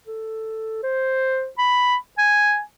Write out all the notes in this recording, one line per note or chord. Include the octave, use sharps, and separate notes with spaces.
A4
C5
B5
G#5